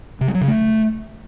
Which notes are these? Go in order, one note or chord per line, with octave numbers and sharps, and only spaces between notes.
C3
G3
F#3
C#3
A3